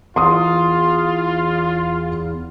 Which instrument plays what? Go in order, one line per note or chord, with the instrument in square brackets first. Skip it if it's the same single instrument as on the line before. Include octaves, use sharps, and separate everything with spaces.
[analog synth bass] E2 [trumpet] F4 [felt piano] C6 D#6